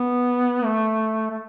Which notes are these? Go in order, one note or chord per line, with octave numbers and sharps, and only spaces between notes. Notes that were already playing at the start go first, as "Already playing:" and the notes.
Already playing: B3
A3
A3